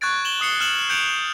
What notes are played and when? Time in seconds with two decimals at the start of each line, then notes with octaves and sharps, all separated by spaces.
0.01 C#6 F#6 G#6 A6 D7
0.25 E7 F#7 G7
0.40 C#6 D#6 C7 C#7 G7
0.60 F6 E7 F#7
0.89 F#6 G6 C#7 D7 E7 F7